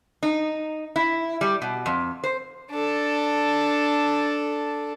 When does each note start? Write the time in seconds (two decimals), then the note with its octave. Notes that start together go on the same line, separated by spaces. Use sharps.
0.23 D#4
0.96 E4
1.41 G3
1.62 B2
1.86 F2
2.24 C5
2.71 D4 A4